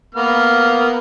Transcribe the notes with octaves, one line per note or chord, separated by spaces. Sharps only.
A#3 B3 F6